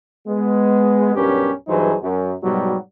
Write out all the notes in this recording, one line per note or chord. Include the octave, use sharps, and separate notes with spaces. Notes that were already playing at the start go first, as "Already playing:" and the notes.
G#3 B3
B1 G2 C#4 G4 A#4 B4
G2 E3 F#3 D#4 G#4 C5
F#2
G#2 B2 F#3 G3